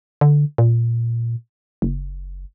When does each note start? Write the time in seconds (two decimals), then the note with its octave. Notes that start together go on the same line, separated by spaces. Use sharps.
0.21 D3
0.58 A#2
1.82 F#1